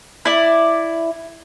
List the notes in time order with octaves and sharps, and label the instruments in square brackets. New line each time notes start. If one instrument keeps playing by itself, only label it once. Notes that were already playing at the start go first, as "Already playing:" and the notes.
[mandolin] E4 D5